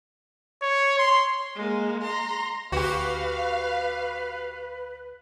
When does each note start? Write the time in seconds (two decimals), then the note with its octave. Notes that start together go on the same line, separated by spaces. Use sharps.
0.62 C#5
0.99 C6
1.56 G#3 A#3
2.03 A#5 C6
2.72 D2 F#4 G4 B4 F5